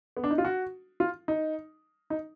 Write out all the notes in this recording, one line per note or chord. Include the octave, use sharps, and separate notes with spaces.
B3
D4
D#4
F4
F#4
F4
D#4
D#4